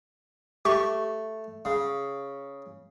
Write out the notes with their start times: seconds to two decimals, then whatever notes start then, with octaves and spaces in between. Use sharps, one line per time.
0.65 A3 G4 C#6
1.65 C#3